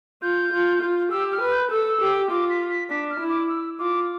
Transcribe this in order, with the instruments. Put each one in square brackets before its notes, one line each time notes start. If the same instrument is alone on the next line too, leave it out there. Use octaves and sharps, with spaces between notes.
[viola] F4 [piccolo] G6
[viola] F4
F4
[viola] G4 [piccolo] E6
[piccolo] F6
[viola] B4
[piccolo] G6
[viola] A4 [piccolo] E6
[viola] G4
[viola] F4 [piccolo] D6
[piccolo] B6
B6
[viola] D4 [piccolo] B6
[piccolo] F6
[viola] E4
[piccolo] D6
E6
[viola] F4 [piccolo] D6